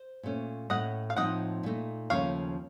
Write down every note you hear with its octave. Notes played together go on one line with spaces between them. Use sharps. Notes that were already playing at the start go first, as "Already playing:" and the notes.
Already playing: C5
A#2 A3 C#4
A2 A3 C#4 D#5 F#5
F5
A2 F3 C4 D#4 D#5 F#5
A#2 A3 D#4
D#2 C#3 F3 A3 C#4 C#5 F5